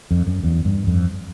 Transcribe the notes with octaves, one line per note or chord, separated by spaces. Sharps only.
F2
F#2
E2
G2
F2